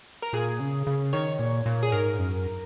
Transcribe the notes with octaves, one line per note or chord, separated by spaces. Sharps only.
A#4
A#2 G#4
C#3
C#3
D#3 C#5
A#2
A#2
G#4
G#2 A#4
F#2